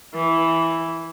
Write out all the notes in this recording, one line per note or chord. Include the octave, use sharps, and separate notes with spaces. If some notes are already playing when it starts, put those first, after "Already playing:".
E3